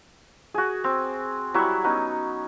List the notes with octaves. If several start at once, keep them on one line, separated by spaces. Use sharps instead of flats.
F#4 G#4
C4
F#3 G3 E4 C#6
B3 C#4 D#4